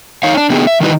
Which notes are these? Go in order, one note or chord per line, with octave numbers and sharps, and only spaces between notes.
D#4 C#5 F5
D4
D3 B3 D#4 G4 G#4
E5
D#3 E3 G3 D#4 E4 B4